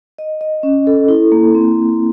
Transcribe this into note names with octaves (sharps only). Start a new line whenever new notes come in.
D#5
D#5
C#4
A4
E4
A#3
C4